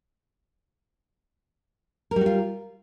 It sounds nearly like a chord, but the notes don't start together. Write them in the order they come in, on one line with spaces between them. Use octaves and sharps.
A#4 G3 F#4 F4